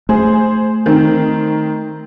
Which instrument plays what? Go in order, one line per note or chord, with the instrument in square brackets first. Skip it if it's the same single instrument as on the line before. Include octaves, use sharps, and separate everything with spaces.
[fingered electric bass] A3 [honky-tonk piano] G#4 C5
[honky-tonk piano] D#3 C4